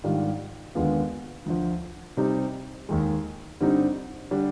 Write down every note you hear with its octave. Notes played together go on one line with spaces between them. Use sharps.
G#2 D#3 G3 D4 F4
D#2 D3 G#3 B3 F4
D2 D3 F3
C3 G3 C4 D#4
D#2 D#3 G#3
G2 D3 G3 C4 D#4
D3 G3 D4